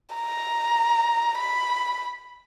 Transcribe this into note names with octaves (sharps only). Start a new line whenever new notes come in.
A#5
B5